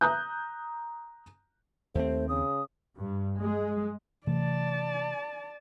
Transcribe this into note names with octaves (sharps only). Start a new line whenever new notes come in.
A#5 D#6 F#6 G6
D#2 A3 C4 C5
C#3 D#6
G2
G#3
C3 E3 A3 D5 A5